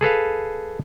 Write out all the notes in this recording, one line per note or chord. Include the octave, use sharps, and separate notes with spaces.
G#4 A4 B4 F5